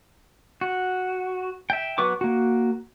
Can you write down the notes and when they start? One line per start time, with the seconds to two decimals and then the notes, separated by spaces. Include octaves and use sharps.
0.61 F#4
1.70 E5 G5
1.98 F#3 B3 B4 C#6 D6
2.21 A#3 F#4